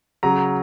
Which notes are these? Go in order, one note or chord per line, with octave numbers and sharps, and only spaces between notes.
C#3 F#3 A#5